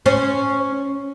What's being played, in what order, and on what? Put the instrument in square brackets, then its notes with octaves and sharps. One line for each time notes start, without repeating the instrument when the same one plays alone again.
[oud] C#4 C5